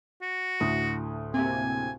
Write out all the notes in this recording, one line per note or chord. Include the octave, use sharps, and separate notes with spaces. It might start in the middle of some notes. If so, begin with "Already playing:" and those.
F#4
D2 A2 D#6
C3 A#3 C4 G#5